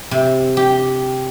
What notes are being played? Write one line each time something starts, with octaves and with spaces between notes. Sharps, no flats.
C3
G4